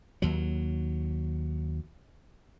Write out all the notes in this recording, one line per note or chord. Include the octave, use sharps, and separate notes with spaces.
D#2 F#3